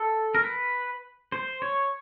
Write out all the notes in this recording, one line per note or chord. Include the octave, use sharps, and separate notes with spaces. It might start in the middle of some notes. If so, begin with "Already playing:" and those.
Already playing: A4
A#4
B4
C5
C#5